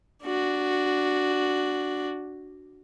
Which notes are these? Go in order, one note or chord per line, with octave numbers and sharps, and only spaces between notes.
D4 F#4